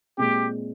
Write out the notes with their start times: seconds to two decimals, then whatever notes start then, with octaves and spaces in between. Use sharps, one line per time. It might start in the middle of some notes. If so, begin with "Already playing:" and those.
0.18 A#2 G#3 C4 G4